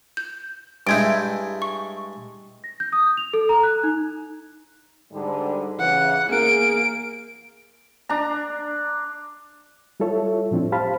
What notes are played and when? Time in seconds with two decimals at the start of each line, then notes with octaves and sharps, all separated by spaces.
0.17 G6
0.87 G2 G#3 E4 G6 G#6 D7
1.62 C#6
2.64 A#6
2.80 G6
2.93 D#6
3.17 F7
3.34 A4
3.49 A#5
3.63 F#6
3.83 D#4
5.11 G#2 D3 G3
5.79 C#3 E3 F#5
6.29 E2 A#3 G#4 A#4 D7
8.09 D4 A#5
10.00 G3 E4 F4 A4 C#5 E5
10.51 A2 F3 C4 D4 E4
10.72 G4 C5 F5 A5 B5